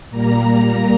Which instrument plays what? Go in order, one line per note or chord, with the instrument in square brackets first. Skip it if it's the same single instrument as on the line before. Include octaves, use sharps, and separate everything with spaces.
[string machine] A#2 G3 A#3 A#5